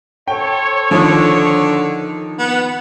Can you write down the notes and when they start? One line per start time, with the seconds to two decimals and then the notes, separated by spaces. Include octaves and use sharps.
0.28 A4 C5 C#5 G5
0.91 D3 D#3 F3
2.39 B3